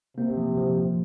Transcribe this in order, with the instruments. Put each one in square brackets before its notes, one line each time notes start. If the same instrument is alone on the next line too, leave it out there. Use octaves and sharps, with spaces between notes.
[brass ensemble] C3 [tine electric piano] A#3
[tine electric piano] F3
F3
F3